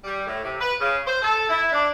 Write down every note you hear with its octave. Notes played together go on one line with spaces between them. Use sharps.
G3
A2
C3
B4
C#3
C5
A4
E4
D4